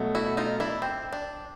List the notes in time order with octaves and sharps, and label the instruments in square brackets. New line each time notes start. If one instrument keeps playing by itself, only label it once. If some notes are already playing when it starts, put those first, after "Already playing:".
Already playing: [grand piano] B2 F#3 A3
[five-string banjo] E4 F#4
D#4 F4
D4 E4
C4
D4